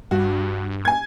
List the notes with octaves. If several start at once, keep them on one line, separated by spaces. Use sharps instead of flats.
G2 F#4
G#5 G#6